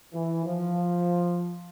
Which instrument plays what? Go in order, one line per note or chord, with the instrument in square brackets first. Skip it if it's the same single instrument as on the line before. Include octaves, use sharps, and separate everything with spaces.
[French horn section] E3
F3